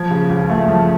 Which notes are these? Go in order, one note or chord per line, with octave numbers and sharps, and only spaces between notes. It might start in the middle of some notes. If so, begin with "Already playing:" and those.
Already playing: F3 G#6
C#3
C#2
A3
F3